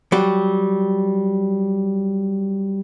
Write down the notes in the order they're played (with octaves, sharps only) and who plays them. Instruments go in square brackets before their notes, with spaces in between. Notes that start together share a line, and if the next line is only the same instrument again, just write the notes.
[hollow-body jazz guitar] F#3 G3